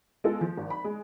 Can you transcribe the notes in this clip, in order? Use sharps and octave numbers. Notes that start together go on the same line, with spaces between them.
G#3 B3 F4 A4
F3
G#1
B5
G#3